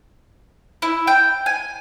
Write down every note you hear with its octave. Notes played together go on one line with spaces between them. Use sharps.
E4
G5
G#5